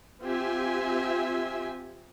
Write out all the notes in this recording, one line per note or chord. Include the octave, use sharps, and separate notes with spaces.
C4 F4 G4 E5 G#5